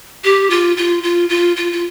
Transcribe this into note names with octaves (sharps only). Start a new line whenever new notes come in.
G4
F4
F4
F4
F4
F4
F4